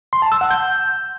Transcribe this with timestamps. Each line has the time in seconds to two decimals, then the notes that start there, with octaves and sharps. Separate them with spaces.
0.13 C6
0.22 A5
0.32 E6
0.41 F#5
0.51 G6